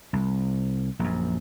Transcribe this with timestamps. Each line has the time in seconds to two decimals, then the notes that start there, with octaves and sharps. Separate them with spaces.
0.13 C2
0.99 A#1 F#2